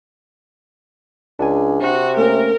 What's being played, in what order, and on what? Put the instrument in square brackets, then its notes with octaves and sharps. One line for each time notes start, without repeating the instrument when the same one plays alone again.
[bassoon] C#2 [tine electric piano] D4 G#5
[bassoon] C3 [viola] F#4
[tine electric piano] A3 A#3 C#4 [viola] A#4